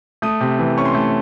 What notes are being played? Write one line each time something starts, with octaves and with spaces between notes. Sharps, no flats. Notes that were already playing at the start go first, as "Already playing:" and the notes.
A3 D#6
C3
E3
C#4 C#6
C6
A3 C#6